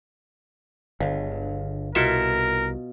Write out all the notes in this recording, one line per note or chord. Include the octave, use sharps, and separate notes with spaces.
G1 C#2 D3
C2 B2 E4 F4 A4 A#4 E5